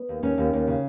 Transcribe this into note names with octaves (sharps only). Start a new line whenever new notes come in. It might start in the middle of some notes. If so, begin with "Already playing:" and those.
Already playing: B3
D#2
D#2 C#4
D#2
D#2
C#3